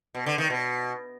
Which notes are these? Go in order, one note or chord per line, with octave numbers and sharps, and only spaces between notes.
B2
D3
D#3
B2